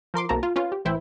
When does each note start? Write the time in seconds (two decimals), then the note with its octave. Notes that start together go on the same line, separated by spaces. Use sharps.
0.14 F3 A#4 C6 D6
0.29 B1 A#3 C4 F#4 A5 A#5
0.43 F4
0.56 C#4 F4 B4 C#5
0.72 G4
0.85 A1 E3 E4 C5 G5